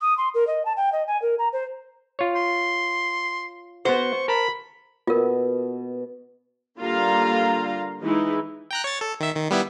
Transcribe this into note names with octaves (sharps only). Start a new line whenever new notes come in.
D#6
C6
A#4
D#5
A5
G5
D#5
G#5
A#4
A#5
C5
F4 C#5
C6
B3 F#4 C5 C#6
A#4 A5 B5
B2 F4 A#4
D3 G3 A#3 F4 F5 A#5
E3 G#3 D#4 E4
G5 A#5 F#6
C#5 A6
A4
D#3 E5
D#3
G3 B3 E4